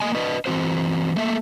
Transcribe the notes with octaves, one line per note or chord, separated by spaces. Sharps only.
A#3 D#5 G#5
D4 B4 D#5
E3 G#3 C4 F#4 C5
A3 A#3 E5